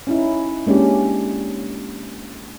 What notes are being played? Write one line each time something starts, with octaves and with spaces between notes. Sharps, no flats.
C#4 D#4 E4
G#3 A#3 C#4 D4 G4